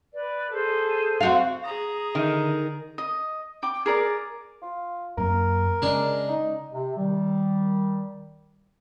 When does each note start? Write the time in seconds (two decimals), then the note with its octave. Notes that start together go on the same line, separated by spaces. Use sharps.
0.13 B4 D5
0.50 G#4 A4 C5
1.21 C4 F#4 F5
1.64 G#4 A#5 D#6
2.15 D3 D#3
2.98 D#5
3.63 G5 D6
3.86 G#4 A#4 D5
4.62 F4
5.18 F#2 A#3 A#4
5.82 C#3 G#3 D4
6.28 D#4
6.72 C3
6.96 D#3 G3